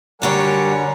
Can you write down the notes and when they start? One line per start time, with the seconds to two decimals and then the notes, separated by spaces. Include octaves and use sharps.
0.22 F#2 D3 G3 A#4 C#5 F#5 G#5